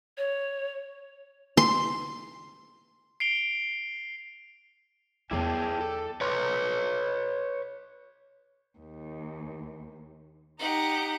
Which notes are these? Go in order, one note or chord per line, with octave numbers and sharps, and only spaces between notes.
C#5
C6
C7 D7 F7 G7
E2 F#3 E4 G#4 C#5 D5 G5 A5
A4
B4 C#5
D#2
D#4 G4 F#5